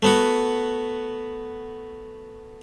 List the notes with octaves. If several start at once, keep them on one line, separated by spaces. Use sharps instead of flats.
A3 B3 F#4